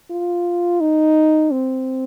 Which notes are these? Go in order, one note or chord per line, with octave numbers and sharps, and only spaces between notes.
F4
D#4
C4